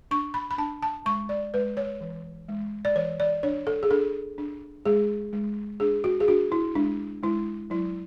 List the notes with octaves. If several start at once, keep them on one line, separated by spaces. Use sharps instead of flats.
D4 C#6
B5
B5
D4 A5
A5
G#3 C#6
D5
G#3 B4
C#5
E3
G#3
D5
E3 C#5
D5
D4 C#5
A4
G#4
D4 A4
D4
G#3 G#4
G#3
D4 G#4
F#4
G#4
D4 F#4
E4
G#3 D4
G#3 E4
F#3 E4